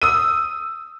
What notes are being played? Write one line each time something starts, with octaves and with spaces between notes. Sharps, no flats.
D#6 E6 D#7